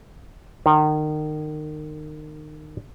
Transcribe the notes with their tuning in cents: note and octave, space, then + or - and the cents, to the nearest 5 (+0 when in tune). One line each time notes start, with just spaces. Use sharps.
D#3 -30